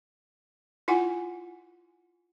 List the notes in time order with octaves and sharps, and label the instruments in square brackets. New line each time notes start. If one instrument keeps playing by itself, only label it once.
[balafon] E4 F4 F#5 G#5